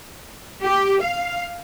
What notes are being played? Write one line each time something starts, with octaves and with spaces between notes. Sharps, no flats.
G4
F5